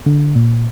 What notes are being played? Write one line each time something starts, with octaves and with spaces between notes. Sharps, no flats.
D3
A#2